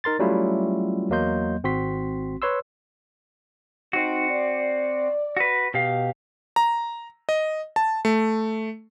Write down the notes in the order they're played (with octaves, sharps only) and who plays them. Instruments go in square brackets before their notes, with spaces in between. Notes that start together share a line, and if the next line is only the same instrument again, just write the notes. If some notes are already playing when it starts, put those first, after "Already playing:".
[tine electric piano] D#4 A#4 C6 A6
F#3 G3 A3 C#4 E4 F4
E2 F#3 A#3 D#5 C6 G6
G#1 C4 F#4 C6 B6
B4 C#5 C6 E6
[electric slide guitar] C4 F#4 [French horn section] D#4
[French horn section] D5
[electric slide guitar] F#4 B4
B2 G4 F5
[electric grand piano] A#5
D#5
A5
A3